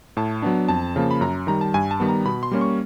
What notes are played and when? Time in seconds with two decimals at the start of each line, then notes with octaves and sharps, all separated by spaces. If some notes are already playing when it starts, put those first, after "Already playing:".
0.17 A2 A5
0.42 F#3 B3 D4
0.69 F2 A5
0.96 C#3 F3 A#3
1.11 B5
1.21 F#2 A#5
1.47 D#3 G3 A#5
1.61 A5
1.74 G2 G#5
1.91 A5
2.00 D#3 G3 B3
2.09 A#5
2.25 B2 B5
2.43 C6
2.52 G3 A#3 C#4
2.61 C#6